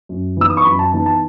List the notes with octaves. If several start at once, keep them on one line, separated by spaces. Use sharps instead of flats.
F#2
E3 B3 D#4 E6
D#6
C#6
F#2 B5
A5
E3 B3 D#4 A5
A5